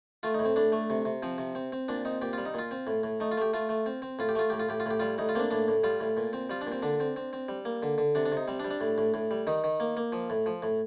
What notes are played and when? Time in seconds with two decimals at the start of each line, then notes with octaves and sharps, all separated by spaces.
0.23 A3 F4
0.34 D#4
0.39 A2
0.45 C4
0.56 A2 D4
0.72 A3
0.90 C3
1.05 C3
1.23 F3 C4
1.38 C3
1.55 C4
1.72 C4
1.88 A#2 D4
2.05 C4 D#4
2.22 A#2 G4
2.33 G3 F4
2.46 D#4
2.54 A#2 F4
2.71 C4
2.87 A2
3.03 A2
3.20 A3 D#4
3.32 F4
3.37 A3 G4
3.53 A3 F4
3.69 A3
3.86 C4
4.02 C4
4.19 A2 F4
4.29 G4
4.35 A3 F4
4.50 A2 G4
4.60 F4
4.69 A2 G4
4.80 F4
4.86 A2 G4
5.00 G3 F4
5.18 A2 D#4
5.29 F4
5.35 A#3 C4
5.40 D4
5.51 A2 D4
5.68 A2
5.84 G3 F4
6.00 A2
6.17 A#2
6.33 C4
6.50 G3 F4
6.61 D4
6.67 A#2
6.72 C4
6.83 D3 D4
7.00 C4
7.16 C4
7.33 C4
7.49 G3
7.65 A#3
7.83 D3
7.98 D3
8.15 C3 D4
8.26 D4
8.32 C3 D#4
8.48 G3 C4
8.60 D4
8.65 G3
8.71 D4
8.81 A2
8.98 A2
9.14 A2
9.31 G3
9.47 D#3 D#4
9.64 D#3
9.80 A#3
9.97 A#3
10.12 F3
10.30 A2
10.46 F3
10.63 A2